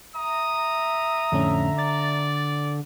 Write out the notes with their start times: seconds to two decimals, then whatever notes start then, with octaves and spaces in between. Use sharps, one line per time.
0.15 E5 A#5 D#6
1.32 F2 A2 D3 C#4
1.79 D5 A6